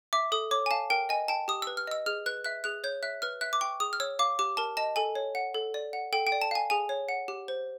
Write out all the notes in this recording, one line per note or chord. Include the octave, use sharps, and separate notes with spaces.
E5 D6
A4 D#6
C#5 D6
G#5
F5 A5
A#4 G5
D#5 G#5
G5 A5
G4 D#6
B4 E6
F6
D#5 E6
G#4 F6
B4 F#6
E5 F#6
G#4 F#6
C#5 G6
E5 F#6
B4 F6
E5 F#6
D6
G5 C#6
G#4 D#6
F6
C#5 E6
F5 D6
G4 D6
A#4 A5
D#5 A5
A4 G#5
C#5
F#5
A4
D5
F#5
A4 G5
G5
D5
A5
F5 G#5
G#4 G#5
C#5
F#5
G4
C5